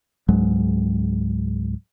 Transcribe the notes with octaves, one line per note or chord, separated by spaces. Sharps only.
C#2 G#2 F#3 G#3